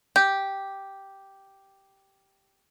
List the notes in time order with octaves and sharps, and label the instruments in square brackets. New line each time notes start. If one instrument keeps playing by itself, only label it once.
[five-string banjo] G4 [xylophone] G6